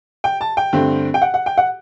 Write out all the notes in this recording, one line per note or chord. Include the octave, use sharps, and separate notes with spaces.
G5
A5
G5
G2 D3 A3 C4
G5
F#5
F#5
G5
F#5